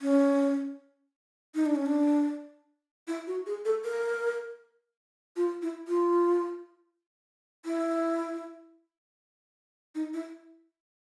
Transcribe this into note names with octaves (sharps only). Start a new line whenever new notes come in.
C#4
D#4
D4
C#4
D4
E4
F#4
G#4
A4
A#4
F4
E4
F4
E4
D#4
E4